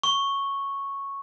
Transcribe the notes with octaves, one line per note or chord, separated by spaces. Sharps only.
C#6